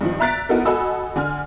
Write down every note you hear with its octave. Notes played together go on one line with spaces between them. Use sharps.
G2 D#3 F3
E5 A#5 F#6 A6 B6 D7
B3 D#4 E4 F#4 A4 A#4
F#4 A4 D#5 G#5 B5 E6
D3 G#5 F6